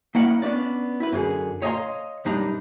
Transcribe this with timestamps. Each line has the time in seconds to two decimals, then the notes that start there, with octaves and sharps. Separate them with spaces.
0.15 A#3 C#4 E4 D#5 F#5
0.42 B3 C#4 D4 D5
1.00 E4 B4
1.12 F#2 D3 G#4
1.62 C#5 D#5 F5 G#5 A#5 C6
2.25 B1 F#2 G3 D4 D#4 A#5